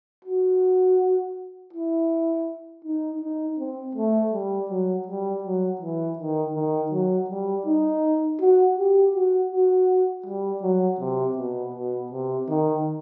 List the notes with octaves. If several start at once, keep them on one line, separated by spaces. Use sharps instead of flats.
F#4
E4
D#4
D#4
C4
A3
G3
F#3
G3
F#3
E3
D#3
D#3
F#3
G3
D#4
F#4
G4
F#4
F#4
G3
F#3
C3
B2
B2
C3
D#3